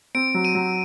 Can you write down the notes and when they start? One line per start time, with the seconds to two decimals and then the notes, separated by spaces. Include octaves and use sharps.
0.15 C4 D7
0.34 F#3
0.45 D#7
0.55 F#3